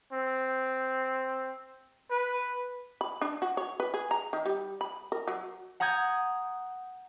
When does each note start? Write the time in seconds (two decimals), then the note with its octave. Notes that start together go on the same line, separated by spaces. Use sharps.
0.13 C4
2.11 B4
3.01 B5
3.22 D4
3.42 F#4
3.57 C#5
3.80 B4
3.94 G#4
4.11 A#5
4.33 D#3
4.46 G3
4.81 B5
5.12 A#4
5.28 F#3
5.80 F#5 A#5 D#6 G6 G#6